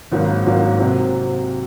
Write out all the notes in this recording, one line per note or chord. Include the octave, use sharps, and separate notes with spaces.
G#1 G#2 F#3 A#3 C#4
G#1 G#2 F#3 A#3 C#4
C3 F#3 C4